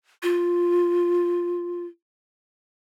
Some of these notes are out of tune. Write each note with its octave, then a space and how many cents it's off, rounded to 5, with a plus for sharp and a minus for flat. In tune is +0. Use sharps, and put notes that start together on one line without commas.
F4 +5